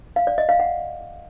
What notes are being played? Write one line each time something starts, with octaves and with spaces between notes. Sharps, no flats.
F5
D5
D#5
F5
F#5